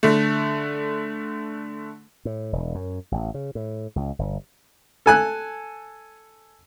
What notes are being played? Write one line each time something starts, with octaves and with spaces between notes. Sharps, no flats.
D3 A3
A2
E1
F#2
A1
C#3
A2
C#2
G1
A4 G#5 F#6